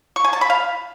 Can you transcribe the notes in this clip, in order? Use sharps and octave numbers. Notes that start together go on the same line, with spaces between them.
C#6
G#5
A5
B5
F5